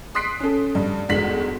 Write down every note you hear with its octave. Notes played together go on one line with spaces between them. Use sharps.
C6 D#6 F#6 B6 C7 D7
C#4 A4
G2
G1 E2 G#2 B2 B6 F#7